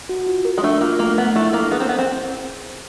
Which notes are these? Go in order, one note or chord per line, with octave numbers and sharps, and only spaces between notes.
F#4
F4
A#4
G#3
A3 D4
A#3 F4
A3 A#3
B3 D4
A3 E4
A#3 A4
B3 G#4
C4
B3 C5
C4